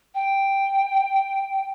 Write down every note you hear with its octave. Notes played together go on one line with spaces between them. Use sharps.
G5